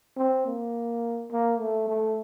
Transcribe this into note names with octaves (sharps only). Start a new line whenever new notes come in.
C4
A#3
A#3
A3
A3